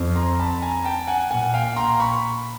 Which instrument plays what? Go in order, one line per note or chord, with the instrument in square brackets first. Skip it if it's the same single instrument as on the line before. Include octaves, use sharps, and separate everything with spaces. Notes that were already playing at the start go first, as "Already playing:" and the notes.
Already playing: [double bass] F2
[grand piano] A#5 C6
A5 B5
G#5 A#5
G5 A5
F#5 G#5
[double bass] A#2 [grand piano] F#5 G#5
[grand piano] F5 G5
A#5 C6
B5 C#6